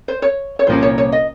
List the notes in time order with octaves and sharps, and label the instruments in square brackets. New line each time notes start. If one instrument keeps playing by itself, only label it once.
[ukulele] C5
C#5
C#5
[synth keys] C2 A#2 F3 A#3 C#4 [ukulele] C5
[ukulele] C#5
C#5
D#5